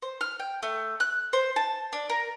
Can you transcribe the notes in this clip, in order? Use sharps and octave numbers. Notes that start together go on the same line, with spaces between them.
C5
F6
G5
A3
F#6
C5
A5
D4
A#4